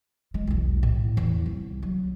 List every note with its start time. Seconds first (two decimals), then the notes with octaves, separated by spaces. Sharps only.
0.34 G#3
0.47 B1 E2
0.83 A2
1.17 E2
1.46 C2
1.82 F#3